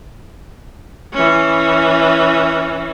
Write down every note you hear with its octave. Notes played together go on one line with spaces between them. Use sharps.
E3 C#4